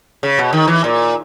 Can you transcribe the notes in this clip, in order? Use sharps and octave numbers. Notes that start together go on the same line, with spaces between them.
C#3
B2
D#3
E3
A#2